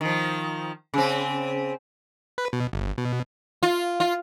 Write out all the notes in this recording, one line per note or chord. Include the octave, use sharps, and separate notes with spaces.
D#3 F3
C#3 C4
B4
B2
G1
B2
F4
F4